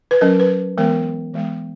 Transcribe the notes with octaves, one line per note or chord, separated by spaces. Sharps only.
B4
F#3 C#4 A#4
B4
E3 G#3 B3 A#4
E3 G#3 B3